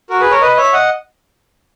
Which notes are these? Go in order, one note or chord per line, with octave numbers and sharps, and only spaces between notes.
F#4 A#4
G#4 B4
A#4 C#5
B4 D#5
C#5 E5
D#5 F#5